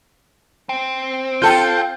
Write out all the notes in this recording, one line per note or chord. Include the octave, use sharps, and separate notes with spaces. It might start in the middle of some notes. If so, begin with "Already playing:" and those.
C4
F4 A4 G5 G6